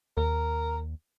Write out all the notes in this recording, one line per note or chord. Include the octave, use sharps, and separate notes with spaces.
D#2 A#4